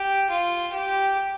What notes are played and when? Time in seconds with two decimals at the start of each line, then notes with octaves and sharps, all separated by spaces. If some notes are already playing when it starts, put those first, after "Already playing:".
Already playing: G4
0.30 F4
0.73 G4